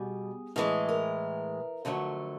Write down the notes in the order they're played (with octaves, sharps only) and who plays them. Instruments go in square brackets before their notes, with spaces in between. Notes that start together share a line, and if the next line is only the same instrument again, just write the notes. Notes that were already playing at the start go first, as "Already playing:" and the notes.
Already playing: [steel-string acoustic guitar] B2 G3 G#4
A2 E3 G#3 G#4
A#4
F2 D3 F#3 A3